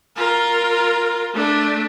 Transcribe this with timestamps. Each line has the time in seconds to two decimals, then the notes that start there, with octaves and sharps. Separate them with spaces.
0.16 F4 A#4
1.34 A3 D4